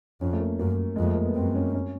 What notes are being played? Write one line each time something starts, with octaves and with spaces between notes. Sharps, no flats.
F2 C#4
A3
A#3
F#2 A#3
F2 G#3
A3
A#3
B3
F#2 C4
C#4
C#4